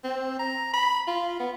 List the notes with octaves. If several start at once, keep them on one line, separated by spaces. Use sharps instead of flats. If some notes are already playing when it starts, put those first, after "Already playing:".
C4
A#5
B5
F4
B3